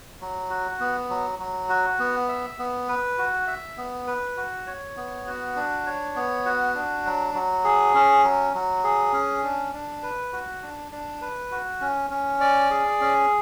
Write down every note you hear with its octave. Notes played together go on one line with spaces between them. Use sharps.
F#3
F#4
B3
F#3
F#3
F#4
B3
E5
B3
B4
F#4
E5
B3
B4
F#4
C#5
B3
F#4
D4
C#5
B3
F#4
D4
F#3
F#3
G#4
C#4
F#3
F#3
G#4
C#4
D4
D4
B4
F#4
D4
D4
B4
F#4
C#4
C#4
D5
G#4
C#4